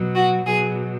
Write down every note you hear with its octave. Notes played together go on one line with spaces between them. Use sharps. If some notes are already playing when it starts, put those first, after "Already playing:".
Already playing: B2 F#3
F#4
B2 F#3 G#4